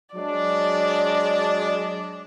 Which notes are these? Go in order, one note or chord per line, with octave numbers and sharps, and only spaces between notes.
F#3 G#3 D4 D5